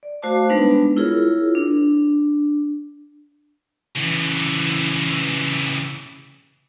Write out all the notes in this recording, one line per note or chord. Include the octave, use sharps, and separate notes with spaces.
D5
A3 F#4 C5 F5 A5 D6
G3 G#3 B3 D4 D#4 B4
E4 F4 G#4 A#4 C#5
D4
C#3 E3